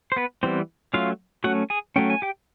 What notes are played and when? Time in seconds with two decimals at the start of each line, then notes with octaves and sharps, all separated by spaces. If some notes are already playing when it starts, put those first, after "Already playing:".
0.12 C5
0.16 B3 B4
0.43 E3 G3 B3 C4 C5
0.94 F#3 A3 C#4 F4 F5
1.44 F#3 A3 C#4 F#4 F#5
1.70 G#4 G#5
1.96 F#3 A3 C#4 G5
2.10 G#5
2.22 G4 G5